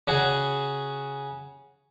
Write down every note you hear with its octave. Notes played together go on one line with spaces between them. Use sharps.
C#3 F#4 G#4